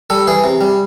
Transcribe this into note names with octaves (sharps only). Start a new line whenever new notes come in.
G3 A4
E3 G#4
C3
G3